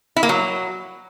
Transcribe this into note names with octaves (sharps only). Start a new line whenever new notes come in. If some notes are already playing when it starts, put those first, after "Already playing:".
E4
A#3
F#3